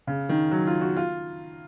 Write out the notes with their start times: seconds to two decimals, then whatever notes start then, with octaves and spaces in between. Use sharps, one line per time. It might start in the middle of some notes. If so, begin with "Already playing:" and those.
0.07 C#3
0.29 D#3
0.51 F#3
0.67 F4
0.81 F#4
0.96 F4